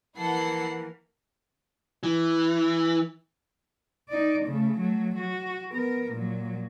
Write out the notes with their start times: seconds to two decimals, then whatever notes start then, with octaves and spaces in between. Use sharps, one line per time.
0.16 E3 A#3 E4 A4 F#5 C7
2.03 E3
4.09 D#4 D5
4.45 C#3 A3
4.78 F#3 A3
5.19 F#4
5.73 B3 A#4
6.12 A#2 F#3